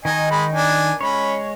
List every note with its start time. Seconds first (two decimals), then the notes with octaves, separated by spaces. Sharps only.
0.05 D#3 D#4 D#5 G#5
0.31 G#3 B5
0.53 D4 G#5
1.01 G#3 C#4 C#5 B5